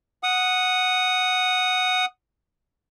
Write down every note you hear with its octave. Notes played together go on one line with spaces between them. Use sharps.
F#5 D#6